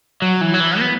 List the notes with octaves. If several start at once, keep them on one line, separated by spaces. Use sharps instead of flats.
F#3
E3
F#3
E3
B3